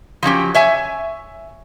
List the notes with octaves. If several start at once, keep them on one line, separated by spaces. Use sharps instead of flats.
F3 F#3 C#4 G4
C#5 E5 G#5